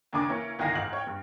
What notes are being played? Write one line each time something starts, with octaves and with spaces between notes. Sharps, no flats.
D#2 C#3 D4 G#5 D6
E3 A#3 C#4
G1 C2 D#3 F5 G#5 A#6
G#2 F6 F#7
C#5 G5
G2